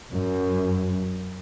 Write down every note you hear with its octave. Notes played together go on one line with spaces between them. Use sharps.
F#2